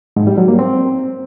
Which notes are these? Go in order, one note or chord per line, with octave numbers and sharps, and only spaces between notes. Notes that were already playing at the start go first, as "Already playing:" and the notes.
G#2
G3
F#3
A#3
C4